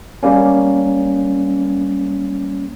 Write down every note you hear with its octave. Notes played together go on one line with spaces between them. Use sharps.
G3 A#3 C#4